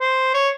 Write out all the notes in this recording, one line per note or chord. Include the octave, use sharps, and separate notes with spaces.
C5
C#5